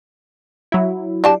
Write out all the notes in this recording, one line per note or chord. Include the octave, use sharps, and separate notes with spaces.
F#3 E4
D4 G4 A5